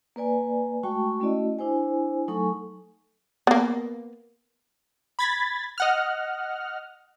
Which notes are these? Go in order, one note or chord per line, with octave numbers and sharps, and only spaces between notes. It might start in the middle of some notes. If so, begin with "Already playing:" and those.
A#3 B4 D5 G#5
G#3 A3 F#4 G5 A5 C#6
A3 C#4 E4 F#4 D5 D#5
D4 E4 C5 G#5
F#3 A3 D#4 A4 G#5 C#6
A#3 B3
B5 G#6 A6 B6
D#5 F#5 F6